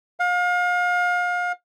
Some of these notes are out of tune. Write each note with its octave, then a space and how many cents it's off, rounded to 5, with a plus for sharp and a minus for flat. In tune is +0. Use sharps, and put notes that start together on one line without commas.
F5 +35